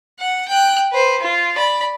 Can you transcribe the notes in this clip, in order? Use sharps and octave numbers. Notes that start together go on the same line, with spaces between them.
F#5
G5 F#6
B4 C5
F4
D5 B5